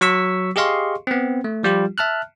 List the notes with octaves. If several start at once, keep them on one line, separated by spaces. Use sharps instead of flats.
F#3 C#6 E6 B6
G4 G#4 D#5 F5 C6 C#6
B3 C4
A3
F3 G3 F4 G4
E5 A5 F6 F#6